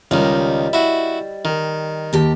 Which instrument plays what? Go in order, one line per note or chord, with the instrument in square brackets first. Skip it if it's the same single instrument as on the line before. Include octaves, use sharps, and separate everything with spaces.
[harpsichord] C#2 D#3 [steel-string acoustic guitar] G3 D#5
[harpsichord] E4 F#4
D#3
[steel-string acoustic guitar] D#2 G4 A5